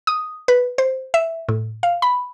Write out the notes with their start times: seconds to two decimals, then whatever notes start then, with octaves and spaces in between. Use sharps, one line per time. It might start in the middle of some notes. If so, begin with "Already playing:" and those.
0.07 D#6
0.48 B4
0.78 C5
1.14 E5
1.49 A2
1.83 F5
2.02 B5